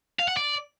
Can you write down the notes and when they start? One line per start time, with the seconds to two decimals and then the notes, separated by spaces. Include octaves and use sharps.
0.20 F5
0.28 F#5
0.37 D5